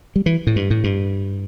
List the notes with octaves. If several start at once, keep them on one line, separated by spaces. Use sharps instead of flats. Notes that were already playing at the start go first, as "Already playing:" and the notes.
G3
E3
A2
G2
A2
G2